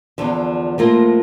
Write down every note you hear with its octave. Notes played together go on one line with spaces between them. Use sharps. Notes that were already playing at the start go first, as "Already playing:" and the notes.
E2 D3 F3
A2 F3 A#3 F4 A#4